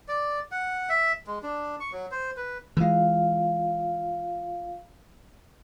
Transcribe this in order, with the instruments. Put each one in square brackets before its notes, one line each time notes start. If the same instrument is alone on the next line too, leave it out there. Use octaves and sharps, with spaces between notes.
[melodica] D5
F#5
E5
G#3
D4
C#6
F#3
C5
B4
[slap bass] E3 G#3 [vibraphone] F4 F5